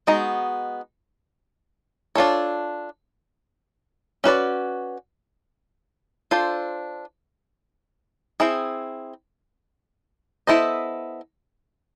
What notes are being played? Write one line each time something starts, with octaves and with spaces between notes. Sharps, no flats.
G#3 B3 D#4 F#4
D4 F4 A4 C#5
C#4 F#4 B4 D5
D4 F4 A4 C5
C4 E4 G#4
B3 E4 A4 C5 D#5